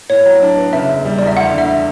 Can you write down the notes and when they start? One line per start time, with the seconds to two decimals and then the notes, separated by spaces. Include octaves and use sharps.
0.10 A2 C#5
0.26 F#3
0.42 D4
0.57 B3
0.73 C#3 E5
0.88 E1
1.05 G3
1.18 E2 D5
1.27 E5
1.37 D2 F#5
1.53 D3
1.58 E5